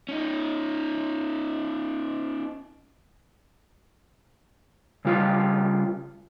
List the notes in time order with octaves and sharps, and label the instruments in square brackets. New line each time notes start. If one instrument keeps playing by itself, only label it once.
[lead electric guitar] C#4 D#4
[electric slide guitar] C#3 G3 F4